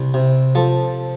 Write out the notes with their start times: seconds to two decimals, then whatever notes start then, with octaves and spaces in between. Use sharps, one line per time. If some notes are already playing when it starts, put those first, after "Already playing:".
Already playing: C2
0.14 C3
0.55 F3 A4